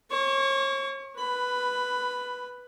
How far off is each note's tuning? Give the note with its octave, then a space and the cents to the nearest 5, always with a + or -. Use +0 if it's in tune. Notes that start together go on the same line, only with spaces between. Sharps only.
C#5 -40 C#6 +25
B4 +0 B5 +15